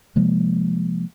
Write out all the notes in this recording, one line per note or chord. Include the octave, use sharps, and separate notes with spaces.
C3 F3 G#3 A#3